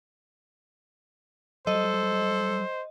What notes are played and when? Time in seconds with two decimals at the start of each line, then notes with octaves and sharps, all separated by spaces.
1.67 F#3 G3 A4 C5 D#5